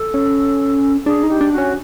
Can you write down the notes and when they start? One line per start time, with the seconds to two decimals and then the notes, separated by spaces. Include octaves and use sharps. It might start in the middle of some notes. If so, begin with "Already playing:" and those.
Already playing: A4
0.14 C#4
1.06 D4 G#4
1.23 D#4
1.29 G4
1.41 D4
1.52 F#4
1.58 C#4